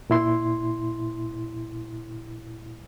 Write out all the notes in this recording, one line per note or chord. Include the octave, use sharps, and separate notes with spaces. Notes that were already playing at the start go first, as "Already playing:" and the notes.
A#2 E4 C6